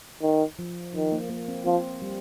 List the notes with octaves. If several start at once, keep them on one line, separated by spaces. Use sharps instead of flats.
D#3
F3
D#3 F3
A#3
A#3
C4
F3 C4
G3